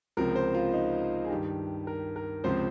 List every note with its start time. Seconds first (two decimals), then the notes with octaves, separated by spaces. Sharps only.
0.17 C#2 C3 F3 A#4
0.35 C5
0.54 F4
0.73 D#4
1.24 G#4
1.30 G2 D#3 G4
1.87 A#4
2.16 A#4
2.44 C#2 C3 F3 C5